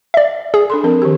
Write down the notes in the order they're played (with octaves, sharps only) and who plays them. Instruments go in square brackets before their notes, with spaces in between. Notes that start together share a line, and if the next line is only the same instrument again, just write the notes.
[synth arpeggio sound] D5 E5
G#4
[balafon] D4 A4 C6
F3 C4 A#4
D#3 G4